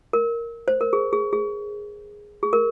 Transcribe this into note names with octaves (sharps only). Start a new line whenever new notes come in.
A#4
C5
A#4
G#4
G#4
G#4
G#4
A#4